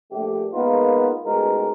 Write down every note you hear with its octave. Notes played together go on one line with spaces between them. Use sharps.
A#1 A3 G4
G#3 A#3 B3 D#4 F4 A#4
A1 B2 G#3 D#4 A#4 C5